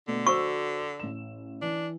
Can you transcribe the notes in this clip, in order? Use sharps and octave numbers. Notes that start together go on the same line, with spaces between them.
B2 D3 A3
F#4 C5 C#6 E6
A1 E7
E3 D4